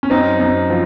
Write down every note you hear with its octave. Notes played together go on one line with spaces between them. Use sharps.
C#4
F#2 C4 D#4
F#2
F3